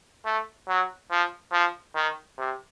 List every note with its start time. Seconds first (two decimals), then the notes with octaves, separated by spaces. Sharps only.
0.25 A3
0.68 F#3
1.11 F3
1.52 F3
1.95 D#3
2.38 C3